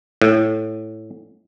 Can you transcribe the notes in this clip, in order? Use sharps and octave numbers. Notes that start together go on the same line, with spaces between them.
A2